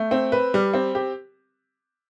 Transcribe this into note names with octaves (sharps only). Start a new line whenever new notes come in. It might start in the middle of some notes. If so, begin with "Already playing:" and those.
Already playing: A3
C4
B4
G3
C4
G4